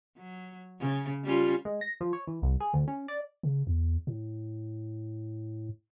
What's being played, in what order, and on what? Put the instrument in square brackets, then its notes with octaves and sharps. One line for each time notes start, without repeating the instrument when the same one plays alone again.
[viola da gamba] F#3
C#3
G3 C#4 F4
[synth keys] G#3
A#6
F3
C#5
E3
C2
G#4
D2
C#4
D5
[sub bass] C#3
E2
A2